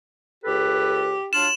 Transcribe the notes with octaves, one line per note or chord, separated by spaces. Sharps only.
C#2 G4 A4 B4
F#3 D4 F4 E7 F#7